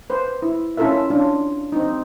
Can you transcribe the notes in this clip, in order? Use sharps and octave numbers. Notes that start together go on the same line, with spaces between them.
B4 C5
E4
C#4 E4 F4 A4 A#4 E5
C#4 D4 F4
C4 D#4